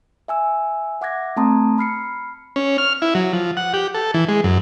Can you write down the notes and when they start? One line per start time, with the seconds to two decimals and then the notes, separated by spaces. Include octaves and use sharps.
0.28 E5 G#5 E6
1.01 E5 F#5 D6 F#6 G#6 A#6
1.36 A3 C4 A5 A#5 C6 D#6
1.78 B5 F6 C7 C#7
2.56 C#4
2.78 F6
3.02 E4
3.15 F#3
3.33 F3
3.57 F#5
3.73 G4
3.94 A4
4.14 E3
4.29 G#3
4.44 F#2